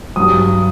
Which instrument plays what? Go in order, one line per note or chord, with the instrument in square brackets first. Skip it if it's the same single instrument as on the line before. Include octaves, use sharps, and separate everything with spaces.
[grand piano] G2 F#3 D#6